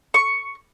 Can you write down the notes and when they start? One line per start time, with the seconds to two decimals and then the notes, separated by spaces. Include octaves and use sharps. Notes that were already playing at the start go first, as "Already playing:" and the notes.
0.14 C#6